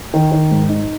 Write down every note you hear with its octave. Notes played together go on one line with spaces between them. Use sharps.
D#3
D#3
G#2
D#4